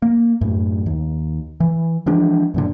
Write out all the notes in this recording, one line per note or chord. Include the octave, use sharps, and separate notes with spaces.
A#3
F#2 A2
D#2
E3
E3 F3 G#3 D4
F#2 A#2 D3